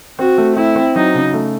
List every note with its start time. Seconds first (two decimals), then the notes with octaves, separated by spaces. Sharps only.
0.19 C4 F#4
0.38 A3
0.56 C4 E4
0.76 C4
0.95 F#3 D#4
1.14 C#3
1.34 A3